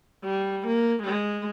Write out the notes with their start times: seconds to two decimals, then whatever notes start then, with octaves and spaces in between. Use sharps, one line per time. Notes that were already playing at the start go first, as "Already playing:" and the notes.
0.24 G3
0.67 A#3
1.03 G#3